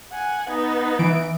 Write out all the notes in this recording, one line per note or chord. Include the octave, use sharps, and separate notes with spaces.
F#5 G#5
B3 D#4
E3 D7